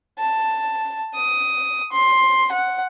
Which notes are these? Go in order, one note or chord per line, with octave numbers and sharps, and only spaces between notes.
A5
D#6
C6
F#5